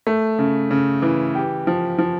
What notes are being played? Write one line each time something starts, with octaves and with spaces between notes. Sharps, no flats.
A3
C#3
C#3
E3
G4
F3
F3